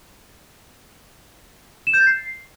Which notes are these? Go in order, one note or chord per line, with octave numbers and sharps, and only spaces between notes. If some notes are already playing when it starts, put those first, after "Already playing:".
E7
G6
A6
C7